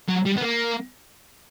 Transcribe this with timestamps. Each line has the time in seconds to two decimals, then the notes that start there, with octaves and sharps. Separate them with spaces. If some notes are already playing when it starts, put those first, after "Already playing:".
0.09 F#3
0.26 G3
0.38 B3
0.43 A#3